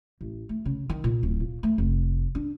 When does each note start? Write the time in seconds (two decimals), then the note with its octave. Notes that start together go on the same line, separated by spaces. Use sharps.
0.21 A1
0.49 A3
0.65 C#3
0.90 D#3
1.04 A#2
1.23 D1
1.40 A#2
1.63 A3
1.78 F1
2.35 D4